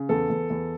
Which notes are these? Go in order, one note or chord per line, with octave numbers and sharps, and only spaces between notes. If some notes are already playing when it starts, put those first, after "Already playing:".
Already playing: C#3
E2 A4
E2
E2